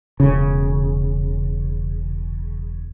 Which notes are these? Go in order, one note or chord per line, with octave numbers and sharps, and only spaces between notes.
E1 C#3